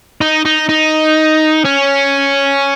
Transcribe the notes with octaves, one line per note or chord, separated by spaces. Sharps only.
D#4
D#4
D#4
C#4